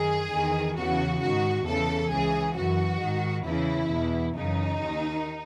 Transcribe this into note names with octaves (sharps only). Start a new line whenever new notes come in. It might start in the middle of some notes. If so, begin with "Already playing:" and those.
Already playing: F#2 D#3 G#4
E2 D#3
E2 C#3 E3 F#4
G#2 D#3 F#4
E2 C#3 E3 A4
C#2 C#3 E3 G#4
F#2 E3 F#4
G#2 D#3
E2 C#3 E3 E4
E2 B2
F#2 C#3 E3 D#4
D#2 D#3